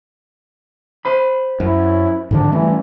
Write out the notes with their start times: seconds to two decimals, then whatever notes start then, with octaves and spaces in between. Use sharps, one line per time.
1.05 C5 B5
1.60 F#2 E4
2.31 G#2 D3 F3 D4
2.52 E3 G3 A3 C#4